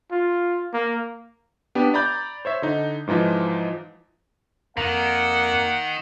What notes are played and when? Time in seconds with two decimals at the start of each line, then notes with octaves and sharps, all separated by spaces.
0.11 F4
0.73 A#3
1.75 B3 D4 G4
1.94 D5 A#5 B5 G6 A6
2.45 C5 C#5 E5
2.62 D3 D#4
3.07 G#2 E3 F3 D#4
4.77 F2 D#3 A#3 F#5